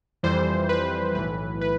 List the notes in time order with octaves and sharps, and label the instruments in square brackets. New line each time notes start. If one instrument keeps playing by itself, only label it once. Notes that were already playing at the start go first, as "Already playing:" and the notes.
[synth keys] F2 E3 G3 C5
B4
B1 A2 E3 B4
B4